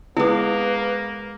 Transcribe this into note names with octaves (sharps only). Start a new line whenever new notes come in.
G#3 A#3 B3 E4 G#4 B4